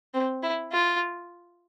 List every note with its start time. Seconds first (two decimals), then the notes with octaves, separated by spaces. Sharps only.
0.14 C4
0.43 E4
0.72 F4